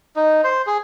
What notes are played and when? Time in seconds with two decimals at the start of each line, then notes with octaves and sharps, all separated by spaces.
0.16 D#4
0.44 C5
0.67 G#4